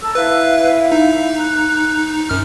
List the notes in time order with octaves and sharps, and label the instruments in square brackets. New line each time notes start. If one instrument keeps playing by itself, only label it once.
[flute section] A4 A#5 E6
[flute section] E4 E5 F5 [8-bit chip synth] B4
[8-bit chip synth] D#4
[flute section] F#6
[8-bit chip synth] F#2 F6 [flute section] A#4